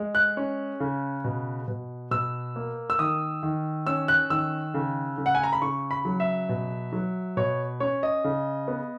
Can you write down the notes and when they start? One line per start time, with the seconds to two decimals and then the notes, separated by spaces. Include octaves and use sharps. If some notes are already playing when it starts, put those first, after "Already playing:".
Already playing: G#3
0.15 F#6
0.37 C#4
0.80 C#3
1.24 B2
1.68 B2
2.11 B2 E6
2.56 A#3
2.90 E6
2.99 D#3 D#6
3.43 D#3
3.87 C#4 E6
4.08 F#6
4.30 D#3 E6
4.74 C#3
5.18 C#3
5.26 F#5
5.35 G#5
5.43 A#5
5.53 B5
5.62 C#3 C#6
5.91 B5
6.05 F#3
6.20 E5
6.49 B2
6.92 F#3
7.37 B2 C#5
7.80 C#4 C#5
8.03 D#5
8.24 C#3
8.68 B3